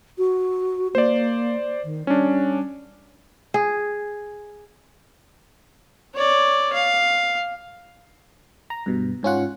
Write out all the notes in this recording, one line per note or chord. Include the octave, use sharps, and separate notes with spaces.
F#4
A#3 C5 D5
D#3
G3 C#4 D4
G#4
C#5 D5
F5
A#5
G2 B2
G#2 C#4 F4 F#5